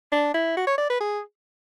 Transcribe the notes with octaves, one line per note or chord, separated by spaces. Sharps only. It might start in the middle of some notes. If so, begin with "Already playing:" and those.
D4
E4
F#4
C#5
D5
B4
G#4